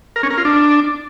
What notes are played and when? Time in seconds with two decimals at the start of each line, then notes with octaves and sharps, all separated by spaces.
0.16 A#4
0.23 C#4
0.30 A#4
0.38 F4
0.45 D4